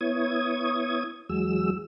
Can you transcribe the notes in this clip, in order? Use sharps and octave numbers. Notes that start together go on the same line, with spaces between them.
B3 E4 C#5 D#6 G#6
E2 F#3 G#3 E6